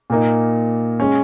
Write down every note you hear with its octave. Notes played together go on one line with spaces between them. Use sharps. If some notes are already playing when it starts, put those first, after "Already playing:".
A#2 A#3 D#4
G#3 C#4